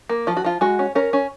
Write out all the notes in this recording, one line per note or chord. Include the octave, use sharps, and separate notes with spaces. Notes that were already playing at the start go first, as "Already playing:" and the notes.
A#3
F3 F4
F#4
F3 F4
G#3 F#4
C#4
C#4 A#4
C#4